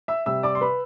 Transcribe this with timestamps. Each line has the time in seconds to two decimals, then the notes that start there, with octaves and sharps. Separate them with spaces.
0.08 E5 E6
0.26 C3 G3 E5 E6
0.43 D5 D6
0.55 C6
0.61 B4 B5